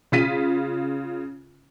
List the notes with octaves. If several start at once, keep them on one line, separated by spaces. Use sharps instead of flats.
C#3 F4 B6 D#7